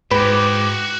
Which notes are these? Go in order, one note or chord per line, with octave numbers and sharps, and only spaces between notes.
G#2 F#4 B4 G5 D6